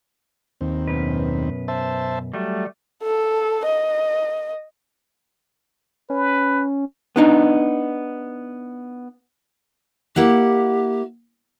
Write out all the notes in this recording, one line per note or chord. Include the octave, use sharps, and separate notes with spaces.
D#2 C4
F#2 B2 B4
C5 E5 A5
F#3 G3 A3
A4
D#5
C#4 B4
B3 D4 D#4
A#3 E4 G4 F#5